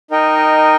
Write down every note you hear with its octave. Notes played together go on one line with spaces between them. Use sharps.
D#4 A#4 D#5 G5